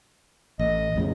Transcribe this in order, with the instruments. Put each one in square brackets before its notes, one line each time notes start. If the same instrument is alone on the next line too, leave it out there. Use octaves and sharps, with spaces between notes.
[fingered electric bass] A1 [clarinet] D#5
[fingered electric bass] F2 A2 C#3